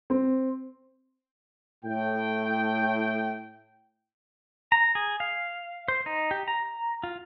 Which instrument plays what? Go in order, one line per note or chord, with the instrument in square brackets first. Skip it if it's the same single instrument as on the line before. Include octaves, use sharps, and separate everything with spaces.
[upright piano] C4
[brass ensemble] A2 G5
[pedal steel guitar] A#5
G#4
F5
C5
D#4
G4
A#5
F4